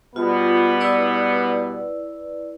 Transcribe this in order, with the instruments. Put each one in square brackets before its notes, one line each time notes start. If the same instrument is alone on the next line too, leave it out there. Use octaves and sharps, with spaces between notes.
[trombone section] B2 G3 B3 [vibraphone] F4
[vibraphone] E4 B4 D5